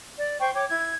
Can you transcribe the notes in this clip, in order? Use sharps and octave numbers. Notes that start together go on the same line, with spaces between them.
D5
C5 G5 C#6
C#5 G5 D6
E4 G#6